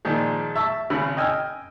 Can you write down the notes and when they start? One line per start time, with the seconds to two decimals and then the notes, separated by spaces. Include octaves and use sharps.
0.05 A#2 D#3 F3 G#3
0.56 E5 A5 C#6
0.90 G#1 C#3 B5
1.17 D#5 G5 G#5 E6 F6